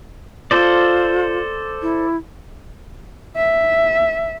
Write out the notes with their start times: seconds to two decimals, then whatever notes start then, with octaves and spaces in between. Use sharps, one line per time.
0.51 F4 A4 C5 D5
1.82 E4
3.37 E5